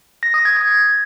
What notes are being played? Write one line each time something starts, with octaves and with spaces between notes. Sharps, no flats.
A#6
D#6
G#6
G#6